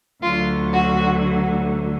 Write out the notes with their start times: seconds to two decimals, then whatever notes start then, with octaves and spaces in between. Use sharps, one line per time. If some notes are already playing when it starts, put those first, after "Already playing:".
0.22 D2 D3 F#3 F4
0.72 F#4